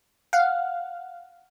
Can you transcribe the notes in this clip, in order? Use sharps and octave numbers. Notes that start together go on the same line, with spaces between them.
F5 F#5